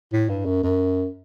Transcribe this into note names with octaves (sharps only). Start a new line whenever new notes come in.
A2
G2
F#2
F#2